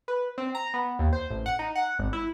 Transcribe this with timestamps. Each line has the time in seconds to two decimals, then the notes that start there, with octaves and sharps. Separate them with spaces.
0.08 B4
0.38 C4
0.55 A#5
0.74 B3
0.99 D#2
1.13 C5
1.31 A1
1.46 F#5
1.59 D#4
1.75 F#5
1.99 G#1
2.13 E4